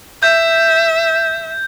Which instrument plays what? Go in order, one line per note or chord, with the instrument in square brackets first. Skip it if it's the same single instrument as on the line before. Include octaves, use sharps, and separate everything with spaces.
[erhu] E5 [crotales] G6